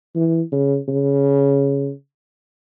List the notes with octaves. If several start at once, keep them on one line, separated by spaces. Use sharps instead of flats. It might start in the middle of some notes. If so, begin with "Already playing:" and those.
E3
C#3
C#3